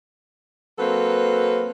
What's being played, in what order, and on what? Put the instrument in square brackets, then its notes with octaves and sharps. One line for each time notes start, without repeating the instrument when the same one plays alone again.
[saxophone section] F#3 A#3 C4 A4 B4